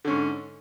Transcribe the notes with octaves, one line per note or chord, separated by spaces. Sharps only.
G#2 D3 C#4